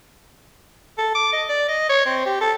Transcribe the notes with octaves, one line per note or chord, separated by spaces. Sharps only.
A4
D6
D#5
D5
D#5
C#5
C4
G4
A4